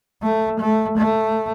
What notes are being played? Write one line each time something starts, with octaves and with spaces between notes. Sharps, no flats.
A3
A3
A3